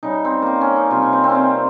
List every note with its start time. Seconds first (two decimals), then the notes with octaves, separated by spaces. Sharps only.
0.03 C#3 G3 D#4
0.25 C4
0.42 A#3 C4
0.61 C#4
0.76 D#4
0.91 C3 G3 F4
1.02 C#4
1.13 C4
1.24 C4
1.29 C#4
1.35 C4